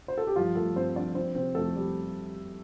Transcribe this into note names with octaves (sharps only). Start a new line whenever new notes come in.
C5
A4
G4
G2 F3 F4
F3 A3 A4
G2 C4 C5
F3 D4 D5
F3 C4 C5
C3 C4 C5
F2 A3 A4
G3 G4